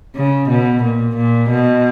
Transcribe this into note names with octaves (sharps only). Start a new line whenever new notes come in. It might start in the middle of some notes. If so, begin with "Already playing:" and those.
C#3
B2
A#2
A#2
B2